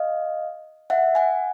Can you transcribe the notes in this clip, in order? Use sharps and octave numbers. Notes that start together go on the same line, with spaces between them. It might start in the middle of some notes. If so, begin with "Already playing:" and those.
Already playing: D#5 F5
E5 F#5
F#5 G#5